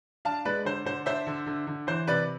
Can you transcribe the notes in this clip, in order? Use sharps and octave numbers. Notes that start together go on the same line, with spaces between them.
D4 F5 A5
G#3 B4 D5
D3 C5
D3 C5
D4 C5 E5
D3
D3
D3
E3 C5
C3 B4 D5